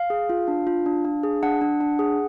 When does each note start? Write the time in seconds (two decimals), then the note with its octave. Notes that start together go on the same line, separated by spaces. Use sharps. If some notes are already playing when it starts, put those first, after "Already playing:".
Already playing: F5
0.10 G#4
0.30 F4
0.48 D4
0.67 F4
0.86 D4
1.05 D4
1.23 G#4
1.43 D4 F#5
1.61 D4
1.81 D4
1.99 G#4